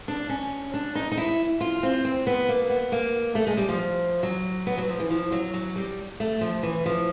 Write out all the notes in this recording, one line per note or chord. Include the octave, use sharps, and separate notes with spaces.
D4
C#4
D4
D#4
D#4
E4
F4
C4
C4
B3
A#3
B3
A#3
A3
G#3
G3
F3
F#3
B3
F#3
F3
E3
F3
F#3
F#3
G3
A3
F3
E3
F3